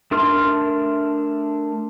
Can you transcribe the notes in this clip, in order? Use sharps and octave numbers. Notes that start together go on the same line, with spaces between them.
A3 D4 A#4 C6 F6